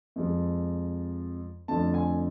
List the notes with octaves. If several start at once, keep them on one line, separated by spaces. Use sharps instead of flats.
F2 F3 G#3
F2 D3 F3 A3 A5
G#5